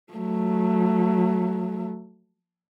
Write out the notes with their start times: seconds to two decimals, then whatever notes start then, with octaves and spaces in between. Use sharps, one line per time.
0.13 F#3 A3